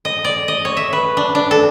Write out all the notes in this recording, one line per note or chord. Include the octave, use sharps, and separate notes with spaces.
D#5
D5
D#5
C#5
E5
B4
D4
D4
A4